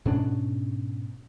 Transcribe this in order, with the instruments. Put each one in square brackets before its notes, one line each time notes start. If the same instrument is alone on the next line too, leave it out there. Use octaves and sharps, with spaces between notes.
[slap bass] G#2 B2 C#4 D4